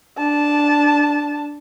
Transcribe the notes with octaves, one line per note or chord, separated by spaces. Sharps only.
D4 A5